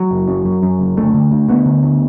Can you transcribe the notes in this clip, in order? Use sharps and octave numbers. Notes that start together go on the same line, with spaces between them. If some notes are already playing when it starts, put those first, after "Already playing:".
Already playing: F#3
F#1
F#2
F#2
F#2
F#1
D2 A3
D3
D2
D2 B3
D3
D2